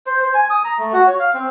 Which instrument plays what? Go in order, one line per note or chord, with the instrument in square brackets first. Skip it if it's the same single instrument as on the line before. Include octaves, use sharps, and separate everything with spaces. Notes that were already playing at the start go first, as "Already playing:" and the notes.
[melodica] C5
C5
G#5
D#6
A#5
A3
F#4
C#5
F5
C4